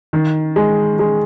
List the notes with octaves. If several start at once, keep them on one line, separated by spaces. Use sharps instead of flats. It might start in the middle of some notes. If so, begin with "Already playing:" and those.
D#3
G#3
G#3